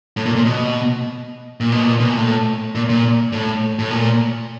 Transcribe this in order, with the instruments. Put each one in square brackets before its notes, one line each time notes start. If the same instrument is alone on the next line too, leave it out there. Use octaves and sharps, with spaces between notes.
[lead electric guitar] A2
A#2
A#2
B2
A#2
B2
A#2
B2
A#2
A2
A#2
A#2
A2
A2
A#2